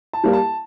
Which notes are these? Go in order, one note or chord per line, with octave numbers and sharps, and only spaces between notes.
A5
G3 A#3
A5